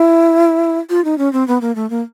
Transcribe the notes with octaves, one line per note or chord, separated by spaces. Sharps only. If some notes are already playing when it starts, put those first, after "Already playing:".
Already playing: E4
F4
D#4
C#4
C4
B3
A#3
A3
A#3